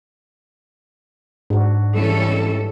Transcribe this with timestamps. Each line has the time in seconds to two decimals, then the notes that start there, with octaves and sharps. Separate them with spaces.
1.50 G#2 D4 F#4
1.95 E3 G3 G#3 C#4 A4